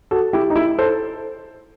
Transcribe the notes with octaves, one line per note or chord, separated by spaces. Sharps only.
F#4 A4
E4 G4
D#4
E4
A4 C5